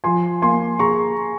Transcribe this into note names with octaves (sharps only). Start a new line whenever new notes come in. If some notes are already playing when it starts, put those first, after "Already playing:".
F3 G#5 C6
A#3 G#5 C6
G#4 A#5 C#6